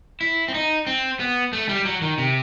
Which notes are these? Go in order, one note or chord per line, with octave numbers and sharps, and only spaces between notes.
E4
C4
D#4
C4
B3
A3
G3
F#3
D#3
C3